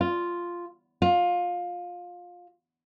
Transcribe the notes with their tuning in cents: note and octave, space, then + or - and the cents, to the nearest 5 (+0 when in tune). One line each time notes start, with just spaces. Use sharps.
F4 -5
F4 +20